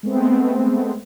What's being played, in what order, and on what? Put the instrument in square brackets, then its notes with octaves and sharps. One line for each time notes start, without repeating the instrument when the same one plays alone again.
[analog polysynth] G#3 A3 B3 C4